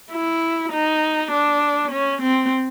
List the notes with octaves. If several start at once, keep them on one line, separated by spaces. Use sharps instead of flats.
E4
D#4
D4
C#4
C4